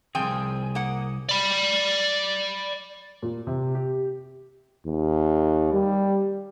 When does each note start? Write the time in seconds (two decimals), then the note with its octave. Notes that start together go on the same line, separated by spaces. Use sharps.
0.15 C2 F3 C4 G#4 G5
0.75 A#3 F#5
1.29 D5 B5
3.22 A#2
3.47 C3
3.75 G4
4.86 D#2
5.73 G3